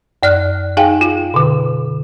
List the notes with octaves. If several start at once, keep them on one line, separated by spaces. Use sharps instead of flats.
F#2 D5 F6 F#6
D#4 G#4 F5 G5 G#5
F4
B2 D3